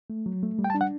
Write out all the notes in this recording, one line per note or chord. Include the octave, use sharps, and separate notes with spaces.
A3
F#3
A3
G3
G5
A5
D4
F#5